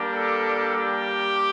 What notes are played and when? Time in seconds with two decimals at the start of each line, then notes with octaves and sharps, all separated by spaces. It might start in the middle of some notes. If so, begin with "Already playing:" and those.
Already playing: G3 A#3 D4 G4
0.11 A4
0.75 G4